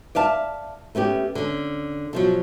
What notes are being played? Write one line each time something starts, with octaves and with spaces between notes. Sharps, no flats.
D5 E5 F5 A5
A3 B3 C#4 G4
D3 C#4
B2 F3 F#3